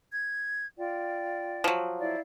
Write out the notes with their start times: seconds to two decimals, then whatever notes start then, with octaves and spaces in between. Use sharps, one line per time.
0.12 G#6
0.78 F4 D5 G5
1.64 F3 F#3
2.00 E4 D5 F5